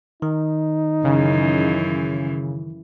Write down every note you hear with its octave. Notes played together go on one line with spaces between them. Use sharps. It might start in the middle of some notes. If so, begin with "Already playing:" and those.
D#3 D#4
F#2 C#3 E3